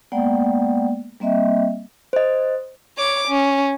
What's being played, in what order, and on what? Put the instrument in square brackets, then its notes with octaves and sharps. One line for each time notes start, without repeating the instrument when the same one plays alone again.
[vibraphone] G#3 A#3 B3 D5 F#5 G5
G3 A#3 C4 D#5 E5 G5
[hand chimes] C5 D#5
[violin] C#5 D6
C#4